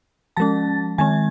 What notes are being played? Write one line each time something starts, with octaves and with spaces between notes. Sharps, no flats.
F3 G#3 C#4 A5 A6
D#3 G#3 C4 G#5 G#6